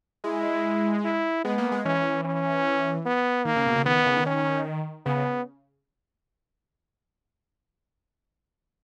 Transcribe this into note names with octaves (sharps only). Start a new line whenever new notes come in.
G#3 E4
E4
G#3 B3
A#3
G#3
E3 C#4
C#4
B3
D#3 A#3
C#3
B2
C#3
D#3 B3
D#3
C#3
D#3
C#4
C#3 B3
C#3